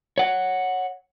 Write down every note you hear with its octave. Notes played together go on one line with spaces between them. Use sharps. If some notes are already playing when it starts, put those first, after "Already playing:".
C#5 F#5